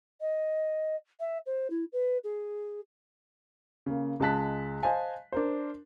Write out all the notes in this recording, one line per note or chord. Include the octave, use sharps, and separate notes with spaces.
D#5
E5
C5
E4
B4
G#4
C#3 A#3
C#2 G#3 F5 A5 F#6 B6
C5 D#5 F5 G#5 A5
D4 A#4 C5